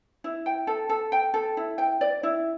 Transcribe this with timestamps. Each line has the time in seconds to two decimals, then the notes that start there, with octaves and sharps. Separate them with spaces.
0.24 E4
0.46 G5
0.67 A4
0.89 A4
1.12 G5
1.34 A4
1.57 E4
1.78 G5
2.01 D5
2.23 E4